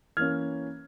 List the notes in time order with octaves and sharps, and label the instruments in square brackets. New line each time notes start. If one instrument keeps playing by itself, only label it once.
[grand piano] E3 A#3 C#4 F6 G#6